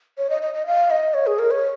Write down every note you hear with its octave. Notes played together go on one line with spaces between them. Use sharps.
C#5
D#5
D#5
D#5
F5
D#5
C#5
G#4
A#4
C#5